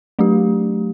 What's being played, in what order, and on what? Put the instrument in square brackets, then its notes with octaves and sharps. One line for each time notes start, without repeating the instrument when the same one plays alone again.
[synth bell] F#3 A3 D4 G4